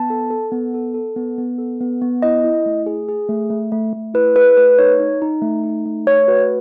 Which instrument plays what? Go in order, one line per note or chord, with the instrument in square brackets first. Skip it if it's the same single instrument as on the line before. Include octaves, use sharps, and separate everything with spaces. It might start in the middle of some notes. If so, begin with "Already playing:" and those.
Already playing: [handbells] B3 A5
A4
A4
B3
A4
A4
B3
B3
A4
B3
B3
E4 D#5
E4
A3
G#4
G#4
A3
A3
A3
A3
E4 B4
G#4 B4
A3 B4
D#4 C#5
D#4
D#4
A3
D#4
A3
A3 C#5
F#4 B4